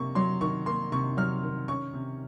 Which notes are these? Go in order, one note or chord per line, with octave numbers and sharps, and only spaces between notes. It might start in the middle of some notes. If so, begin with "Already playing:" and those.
Already playing: C3 A#3 C#6
F#3 C6
D#3 C#6
A#3 C6
C3 C#6
F#3 F6
D#3
C#4 C#6
C3